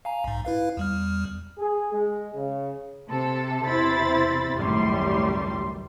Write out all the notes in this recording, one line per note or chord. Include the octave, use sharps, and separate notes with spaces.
F5 G#5 A#5
B1 G#2
E4 B4 F5
E2 G3 F6
G#4
G#3
C#3
C3 A4
E2 C3 E4 C5 B5 A6
G#1 C#2 F#2 A2 G3 C6